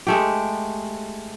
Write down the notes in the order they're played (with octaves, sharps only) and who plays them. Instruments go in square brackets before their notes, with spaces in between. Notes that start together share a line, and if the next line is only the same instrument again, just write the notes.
[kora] G#3 A3 G4